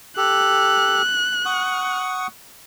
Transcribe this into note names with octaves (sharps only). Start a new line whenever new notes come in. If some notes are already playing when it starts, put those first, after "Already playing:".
G4 A4 F#6
F#5 C#6 D#6